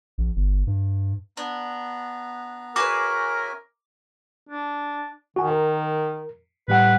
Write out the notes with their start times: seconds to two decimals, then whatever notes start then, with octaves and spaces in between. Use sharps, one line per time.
0.18 A#1
0.36 G1
0.67 G2
1.37 B3 D4 A#5
2.76 C#4 F#4 G#4 A#4 B4 E5 G#5 D6
4.49 D4
5.36 D#3 F#4 G#5
5.50 A#4
6.68 A2 G3 B4 F#5